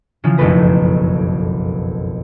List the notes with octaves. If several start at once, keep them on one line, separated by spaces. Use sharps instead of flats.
C#3 E3 F3
F#1 B1 F2 A3 B4 A#6